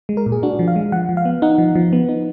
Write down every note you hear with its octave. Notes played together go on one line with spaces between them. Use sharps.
G#3
A#4
A#2
G#4
D4 F#4
F3
F5
G#3
F3 F#5
F3
F5
B3
D#4 F#5
F3
F3
B3
D#4